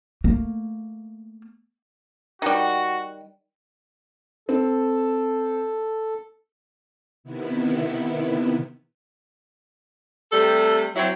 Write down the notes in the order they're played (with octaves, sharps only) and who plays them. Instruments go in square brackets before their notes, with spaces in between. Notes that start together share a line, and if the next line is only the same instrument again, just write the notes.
[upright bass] A3 A#3
[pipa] D#3 G3 [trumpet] F#4
[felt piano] C4 [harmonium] A4
[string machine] C3 D#3 B3 E4
[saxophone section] C3 G3 A3 [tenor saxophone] A4
[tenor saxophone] F#3 [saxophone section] C4 E4 C#5